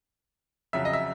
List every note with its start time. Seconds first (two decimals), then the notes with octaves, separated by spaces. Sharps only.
0.73 F2 C#3 F#3 E5
0.85 D#5
0.93 E5